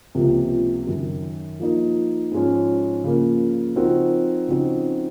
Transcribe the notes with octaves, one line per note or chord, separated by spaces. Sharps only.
C#2 C3 F3 A#3
F#2 D#3 F#3
F3 A#3 D#4
G#2 F3 G#3 C#4
C#3 F3 A#3
F3 C4 D#4 F#4 A#4
C#3 F3 C4 D#4 F#4